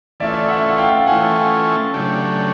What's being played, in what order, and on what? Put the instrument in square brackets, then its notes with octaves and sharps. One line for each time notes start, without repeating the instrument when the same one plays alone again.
[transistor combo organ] E3 A3 C#4 F4 A4 [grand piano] D5 E5
[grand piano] E5 F#5
F#5
F5 G5
[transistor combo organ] E3 A3 C#4 F4 A4 [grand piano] F#5 G#5
[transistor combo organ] C#3 F#3 A3 D4 G4